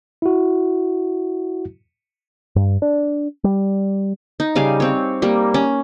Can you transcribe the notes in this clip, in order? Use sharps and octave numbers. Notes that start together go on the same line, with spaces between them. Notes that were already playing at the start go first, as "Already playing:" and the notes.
E4 F#4
G2
D4
G3
D#4
C#3 G3 F5 G#5
C4 C#5
G3 A#3
C#4